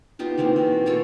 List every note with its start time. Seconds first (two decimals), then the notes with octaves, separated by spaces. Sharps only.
0.19 B3 D#4 F4 G4
0.38 D#3 E3 A#3 C4
0.56 B2
0.86 A#3 F4 A4 C#5